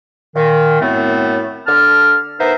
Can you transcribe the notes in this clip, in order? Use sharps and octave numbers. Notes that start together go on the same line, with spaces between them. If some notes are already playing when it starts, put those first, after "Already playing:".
A#2 D#3
F#2 A2 A3 B3 C4
D3 A5 F6
B3 D#4 A#4 C5 E5